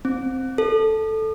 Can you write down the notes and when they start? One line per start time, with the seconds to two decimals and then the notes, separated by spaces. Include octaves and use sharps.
0.05 C4
0.58 A4